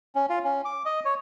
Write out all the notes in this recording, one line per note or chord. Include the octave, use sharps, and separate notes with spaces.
C#4
F4
C#4
D6
D#5
C#5